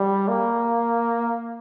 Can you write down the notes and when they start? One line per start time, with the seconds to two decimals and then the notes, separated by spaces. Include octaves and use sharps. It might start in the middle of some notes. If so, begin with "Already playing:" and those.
Already playing: G3
0.28 A#3